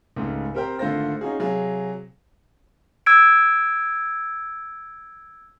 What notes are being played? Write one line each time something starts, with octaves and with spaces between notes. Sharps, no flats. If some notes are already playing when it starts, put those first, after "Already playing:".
C#2 G#2 C#3 A3
C4 G4 A#4 C5 G5
G#1 D3 A3 F4 C5 A#6
C#4 D#4 F4 F#4 G#4
C3 F#3 G#4 F5
E6 G#6 D7